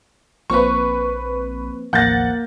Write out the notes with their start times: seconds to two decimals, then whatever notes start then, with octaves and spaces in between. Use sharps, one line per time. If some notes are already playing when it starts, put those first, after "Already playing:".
0.50 A#1 F3 A#3 C4 B4 C#6
1.93 A1 D#2 F3 A#3 F#5 G6 A6 A#6